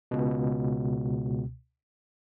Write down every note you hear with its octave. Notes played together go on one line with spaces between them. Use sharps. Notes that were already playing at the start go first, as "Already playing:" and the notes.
C#2 B2